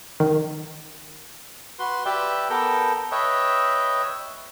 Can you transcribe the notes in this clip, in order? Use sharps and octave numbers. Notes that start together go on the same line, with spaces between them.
D#3
F#4 B4 C6
G4 B4 D5 E5 G5
B3 A4 A#4 G5
B4 C#5 D#5 E5 G5